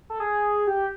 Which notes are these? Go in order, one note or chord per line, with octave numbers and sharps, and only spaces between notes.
A4
G#4
G4